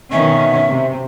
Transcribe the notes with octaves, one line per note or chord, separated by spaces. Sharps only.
B2 D#3 C#4 E5
C3